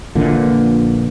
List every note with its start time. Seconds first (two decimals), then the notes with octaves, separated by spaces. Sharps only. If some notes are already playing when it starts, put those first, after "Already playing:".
0.15 A#1 A#2 D3 E3